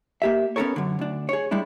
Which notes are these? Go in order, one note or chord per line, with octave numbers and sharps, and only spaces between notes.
A#3 G4 E5
B3 C#4 G4 A4 A#4 C#5
F#2 D3
D2 D4
G#4 C#5
G3 G#3 D4 E4